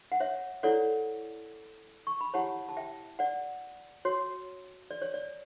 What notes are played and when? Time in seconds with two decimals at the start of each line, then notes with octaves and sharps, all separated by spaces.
0.12 F#5
0.20 C#5 E5
0.63 E4 A4 C#5 D5 F#5
2.07 C#6
2.21 B5
2.34 E4 G4 C#5 F#5 A5
2.69 A5
2.77 E5 G5
3.19 D5 F#5
4.05 F#4 C#5
4.91 D5
5.02 C#5
5.14 D5